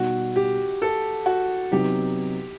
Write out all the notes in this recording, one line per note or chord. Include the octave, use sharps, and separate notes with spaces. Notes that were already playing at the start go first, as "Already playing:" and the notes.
Already playing: B2 G3 D#4 F#4
G4
A4
F#4
C3 F#3 B3 D#4 G4